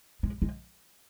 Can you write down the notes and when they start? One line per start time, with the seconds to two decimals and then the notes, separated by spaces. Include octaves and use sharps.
0.23 G#3
0.42 G#3